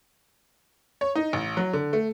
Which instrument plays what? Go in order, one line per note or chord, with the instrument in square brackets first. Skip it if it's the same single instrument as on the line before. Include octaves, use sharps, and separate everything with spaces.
[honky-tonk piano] C#5
D#4
A1
F#3
D3
A3